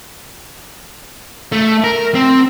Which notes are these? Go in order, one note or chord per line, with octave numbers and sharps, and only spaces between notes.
A3
A#4
C4